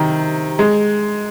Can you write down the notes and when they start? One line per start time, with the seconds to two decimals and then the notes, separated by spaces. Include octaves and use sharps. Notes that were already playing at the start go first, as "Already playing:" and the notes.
Already playing: C3 D#3
0.59 G#3